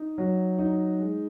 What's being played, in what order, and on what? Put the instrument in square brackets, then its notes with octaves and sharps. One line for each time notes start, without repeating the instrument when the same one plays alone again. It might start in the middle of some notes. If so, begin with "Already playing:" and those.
Already playing: [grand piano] D#4
F#3
D#4
G#3